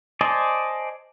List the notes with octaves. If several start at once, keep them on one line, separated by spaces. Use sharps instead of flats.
C5 D5 D#5 G#5 A5